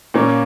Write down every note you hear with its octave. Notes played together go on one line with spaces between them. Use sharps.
A#2 A#3 C#4